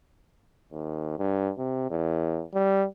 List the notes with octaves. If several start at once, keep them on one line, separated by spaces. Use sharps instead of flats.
D#2
G2
C3
E2
G3